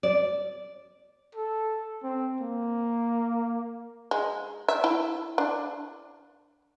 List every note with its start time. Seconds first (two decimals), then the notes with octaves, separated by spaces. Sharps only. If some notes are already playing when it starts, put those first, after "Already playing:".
0.03 D5
1.35 A4
2.03 C4
2.41 A#3
4.11 G#3
4.68 E5
4.84 E4
5.38 D4